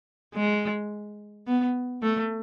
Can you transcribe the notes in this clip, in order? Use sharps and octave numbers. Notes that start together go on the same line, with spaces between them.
G#3
B3
A3